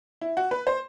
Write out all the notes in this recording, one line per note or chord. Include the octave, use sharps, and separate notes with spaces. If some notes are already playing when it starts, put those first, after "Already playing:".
E4
F#4
B4
C5